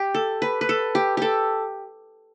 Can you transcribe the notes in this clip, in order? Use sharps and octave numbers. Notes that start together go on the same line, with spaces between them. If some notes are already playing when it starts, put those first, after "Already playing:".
Already playing: G4
A4
B4
B4
A4
G4
G4 A4